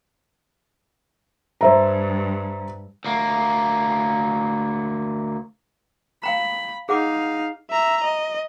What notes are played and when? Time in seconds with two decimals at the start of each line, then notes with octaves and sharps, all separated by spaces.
1.61 G2 C5 E5 A#5
3.04 D2 A#3
6.23 F5 G5 A#5 B5
6.89 D#4 G#4 F5 F#5 D6
7.71 E5 A#5
8.04 D#5